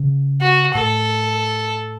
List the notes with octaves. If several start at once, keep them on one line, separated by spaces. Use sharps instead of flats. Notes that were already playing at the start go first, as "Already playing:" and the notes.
Already playing: C#3
F#4
A2 A4